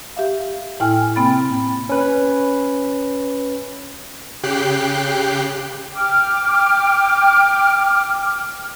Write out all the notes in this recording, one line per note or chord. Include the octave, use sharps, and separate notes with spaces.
G4 E5 F5
A2 E4 G5 G#5 F6
C3 A#3 C4 G5 B5 A6
C#4 B4
C#3 G4 G5 F#6 C7
G5 D6 F6